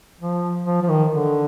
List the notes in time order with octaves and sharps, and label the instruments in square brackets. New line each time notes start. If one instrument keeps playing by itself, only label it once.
[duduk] F3
F3
F3
D#3
D3